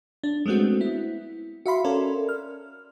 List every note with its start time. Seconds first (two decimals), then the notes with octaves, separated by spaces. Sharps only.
0.24 D4
0.46 G#3 A3 B3 C4 F#4
0.81 E4
1.66 F#4 E5 F5 B5 C6
1.84 C#4 A4 A#4 D5
2.29 F6